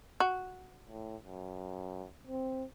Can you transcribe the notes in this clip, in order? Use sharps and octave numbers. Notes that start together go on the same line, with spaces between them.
F#4
A2
F#2
C4